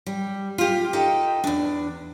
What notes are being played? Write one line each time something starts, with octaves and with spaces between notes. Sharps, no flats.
G3
F4 G4
D#4 A4 G5
E2 D4